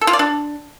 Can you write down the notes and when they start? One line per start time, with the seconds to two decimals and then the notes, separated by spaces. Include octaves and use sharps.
0.01 A4
0.07 F4
0.13 D5
0.19 D4